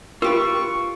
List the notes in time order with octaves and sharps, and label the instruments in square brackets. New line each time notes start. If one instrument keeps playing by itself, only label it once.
[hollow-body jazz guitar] F4 G4 B4 [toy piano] A#4 [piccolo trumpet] C#6